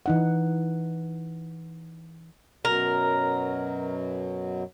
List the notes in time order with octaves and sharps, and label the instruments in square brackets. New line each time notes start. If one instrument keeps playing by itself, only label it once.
[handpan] E3 D#4 F#5
[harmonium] F#2 B2 F#3 [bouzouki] A#4